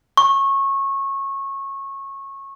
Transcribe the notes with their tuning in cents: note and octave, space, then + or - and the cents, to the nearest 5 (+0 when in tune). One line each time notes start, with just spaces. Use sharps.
C#6 -20